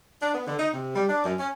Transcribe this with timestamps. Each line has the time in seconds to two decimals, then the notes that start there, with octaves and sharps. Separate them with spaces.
0.22 D4
0.35 B3
0.47 D3
0.59 D#4
0.73 C3
0.95 G3
1.08 D4
1.24 F#2
1.39 C#4